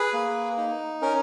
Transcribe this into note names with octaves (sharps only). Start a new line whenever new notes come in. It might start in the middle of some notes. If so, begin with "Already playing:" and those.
Already playing: G#4 B4
A#3
D#4
C#4 A#4